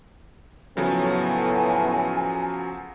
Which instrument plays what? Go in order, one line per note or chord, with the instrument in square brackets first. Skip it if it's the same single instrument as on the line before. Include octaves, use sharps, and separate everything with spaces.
[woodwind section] A2 [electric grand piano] C#3 F3 F#3 [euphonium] B3 [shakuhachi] G#5